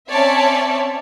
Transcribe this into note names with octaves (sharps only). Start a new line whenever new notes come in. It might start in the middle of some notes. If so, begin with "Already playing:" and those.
C4 C#4 C#5 D5 E5 A5